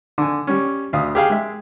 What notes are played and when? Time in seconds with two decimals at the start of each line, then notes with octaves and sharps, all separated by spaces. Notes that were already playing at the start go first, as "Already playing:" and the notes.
0.18 D3 G#5
0.47 G3 C#4
0.93 D2 F5 D#6
1.15 G4 G#4 F5 G5
1.30 G#3 E5